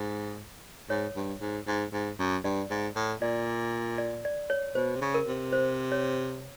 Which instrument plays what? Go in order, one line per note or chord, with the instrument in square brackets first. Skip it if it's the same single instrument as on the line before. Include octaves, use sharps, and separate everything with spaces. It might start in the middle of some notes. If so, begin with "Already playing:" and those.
Already playing: [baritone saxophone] G#2
[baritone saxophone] G#2 [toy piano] C#5
[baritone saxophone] G2
G#2
G#2
G#2
F#2
[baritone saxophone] G2 [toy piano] D5
[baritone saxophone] G#2
A2
[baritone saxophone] A#2 [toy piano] D5
[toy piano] D5
D5
C#5
[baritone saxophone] B2 [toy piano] C5
[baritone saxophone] C3
C#3
[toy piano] A#4
[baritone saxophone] C3
[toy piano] C5
C#5